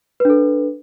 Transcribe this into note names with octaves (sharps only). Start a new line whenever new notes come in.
D4 A4 B4